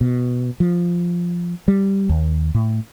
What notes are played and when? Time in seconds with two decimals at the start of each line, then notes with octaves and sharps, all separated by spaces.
0.01 B2
0.60 F3
1.68 G3
2.09 D#2
2.54 A2